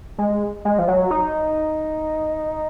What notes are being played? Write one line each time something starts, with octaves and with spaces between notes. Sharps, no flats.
G#3
G#3
F3
F#3
D#4